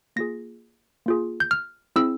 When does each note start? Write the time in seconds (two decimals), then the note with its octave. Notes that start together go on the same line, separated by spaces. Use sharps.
0.16 A#3 F4 G#4 A#6
1.06 A#3 F4 G#4
1.40 G6
1.51 F6
1.96 C4 E4 G#4 E6